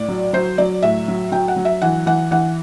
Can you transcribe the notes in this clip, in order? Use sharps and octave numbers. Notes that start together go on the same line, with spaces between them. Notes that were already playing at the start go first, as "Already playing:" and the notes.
Already playing: A2 D5
F#3
F#3 C5
F#3 D5
A2 E5
F#3
F#3 G5
F#5
F#3
E5
E3 F#5
E3 F#5
E3 F#5